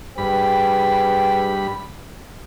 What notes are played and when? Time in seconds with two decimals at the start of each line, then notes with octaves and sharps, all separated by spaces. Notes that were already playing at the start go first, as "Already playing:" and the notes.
0.18 G2 G#4 B4 G5 B5